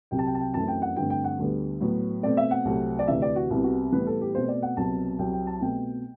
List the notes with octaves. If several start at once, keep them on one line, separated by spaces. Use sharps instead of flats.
C2 C3 F#3 G5
A5
G5
A5
G5
F#2 E3 A3 C4 A5
G5
F#5
G2 D3 A3 C4 G5
G5
F#5
D2 D3 G3 B3
A2 F#3 B3
B2 A3 C4 D5
E5
F#5
C2 C3 F#3 A3 C4
D5
D2 C3 E3 E5
D5
F#4
C2 C3 G3 B3 E4
F#4
A2 E3 G3 B3 B4
A4
G4
B2 A3 C4 C5
D5
F#5
C2 B2 F#3 C4 A5
C2 C3 F#3 C4 G5
G5
A5
B2 A3 C4 G5